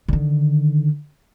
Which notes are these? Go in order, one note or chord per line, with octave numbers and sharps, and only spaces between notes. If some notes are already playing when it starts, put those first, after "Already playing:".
D3 D#3